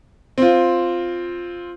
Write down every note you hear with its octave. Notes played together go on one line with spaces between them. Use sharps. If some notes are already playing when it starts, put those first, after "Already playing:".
C4 F4